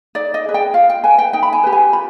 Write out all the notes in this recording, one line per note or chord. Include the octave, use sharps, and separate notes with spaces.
D#4 D5
D#5
G#4 B4
G5
F4 F5
G5
B4 G#5
G5
D#4 G5
B5
G#5
G4 B4
G#5
F4 B5